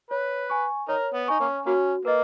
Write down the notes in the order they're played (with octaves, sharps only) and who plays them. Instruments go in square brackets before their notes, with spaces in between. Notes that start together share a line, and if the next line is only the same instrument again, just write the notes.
[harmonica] B4 [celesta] C#5
[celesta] G#5 C#6
[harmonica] D#4 A#4 [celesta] C#5
[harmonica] B3
[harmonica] D#4 [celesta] G#5 C#6
[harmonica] A#3 C#4
[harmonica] A#3 C#4 [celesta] F#4
[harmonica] A#3 [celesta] B4 D#5